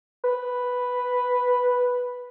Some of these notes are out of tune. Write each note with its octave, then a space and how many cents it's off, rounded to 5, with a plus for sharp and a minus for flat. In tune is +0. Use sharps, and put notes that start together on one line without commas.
B4 +0